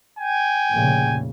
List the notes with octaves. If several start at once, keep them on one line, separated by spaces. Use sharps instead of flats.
G5 G#5
F1 A#2 C#3